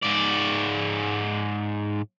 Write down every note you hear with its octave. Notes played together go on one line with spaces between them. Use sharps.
G#2 D5